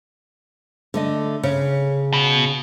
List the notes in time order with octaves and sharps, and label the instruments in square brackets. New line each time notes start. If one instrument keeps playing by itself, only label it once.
[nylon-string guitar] D3 A3 D#5
C#3
[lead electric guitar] B2